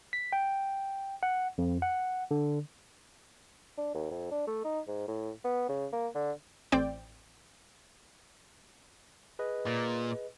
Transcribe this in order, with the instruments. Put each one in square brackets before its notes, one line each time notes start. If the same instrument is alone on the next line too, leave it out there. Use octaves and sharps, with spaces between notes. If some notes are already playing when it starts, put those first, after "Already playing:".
[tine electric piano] B6
G5
F#5
F2
F#5
D3
[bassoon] D4
D#2
F2
D4
A3
D#4
G#2
A2
B3
C#3
A#3
D3
[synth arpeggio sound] A1 C4 D5 G5
[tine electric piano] G#4 B4 D#5
[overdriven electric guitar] A#2